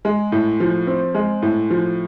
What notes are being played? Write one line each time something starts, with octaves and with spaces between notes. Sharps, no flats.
G#3
A2
F3
C4
G#3
A2
F3